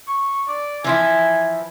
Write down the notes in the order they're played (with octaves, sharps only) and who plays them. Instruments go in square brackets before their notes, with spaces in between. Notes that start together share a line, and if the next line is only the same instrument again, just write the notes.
[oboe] C#6
D5
[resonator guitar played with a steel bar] E3 F3 E4 [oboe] G#5